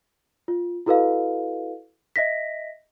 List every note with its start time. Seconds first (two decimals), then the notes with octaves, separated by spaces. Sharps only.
0.48 F4
0.86 E4 F#4 A4 B4 D#5 F5
2.16 D#5 E5 A#6 B6